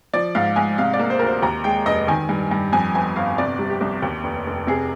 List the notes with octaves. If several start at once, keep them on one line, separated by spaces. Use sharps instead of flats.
F3 D5
G#2 F5
G#2 G#5
C3 F5
D5
A#3
C5
D2 A#4
C5
D#2 A#5
G#3 G5
F1 D#5
D#3 G#5
G2
G2
F2 G#5
G1 G#5
G1 F5
C3 D5
G3
G4
C2
D#2
F1
F1
C3 G#4